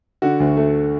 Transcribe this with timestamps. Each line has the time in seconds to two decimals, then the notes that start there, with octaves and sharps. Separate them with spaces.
0.22 D3 F#4
0.40 D2
0.57 A3